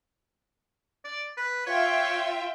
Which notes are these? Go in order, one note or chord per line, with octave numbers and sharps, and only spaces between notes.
D5
B4
F4 C#5 E5 G5